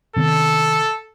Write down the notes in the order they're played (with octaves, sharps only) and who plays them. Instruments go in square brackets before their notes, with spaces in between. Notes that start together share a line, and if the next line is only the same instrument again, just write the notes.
[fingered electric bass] C3 D#3 B3 [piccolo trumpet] A4